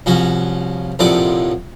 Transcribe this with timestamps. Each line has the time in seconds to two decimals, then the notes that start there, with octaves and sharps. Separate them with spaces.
0.06 C2 F3 C#4 F#4
0.99 A#1 F2 A2 C3 D5 F#5